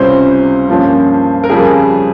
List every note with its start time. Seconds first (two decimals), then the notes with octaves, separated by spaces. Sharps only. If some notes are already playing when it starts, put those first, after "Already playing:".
Already playing: C#2 C3 G3 C#4 C5
0.68 G2 F3 A#3 C#4
1.44 A#4
1.49 F2 C#3 G3 G#4